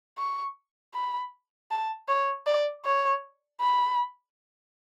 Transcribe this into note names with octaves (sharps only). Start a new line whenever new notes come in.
C#6
B5
A5
C#5
D5
C#5
B5